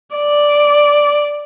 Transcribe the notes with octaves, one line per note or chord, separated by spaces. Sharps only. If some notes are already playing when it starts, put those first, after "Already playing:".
D5